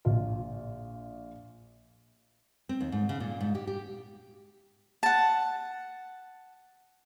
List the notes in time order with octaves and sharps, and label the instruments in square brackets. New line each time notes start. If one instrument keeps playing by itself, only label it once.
[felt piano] A#1 F4
[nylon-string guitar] C4
D#2
G#2
C#3
A#2
G#2
G4
G4
[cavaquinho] F#5 A5